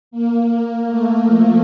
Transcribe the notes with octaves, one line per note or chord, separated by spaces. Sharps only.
A#3
A#3
A3
F3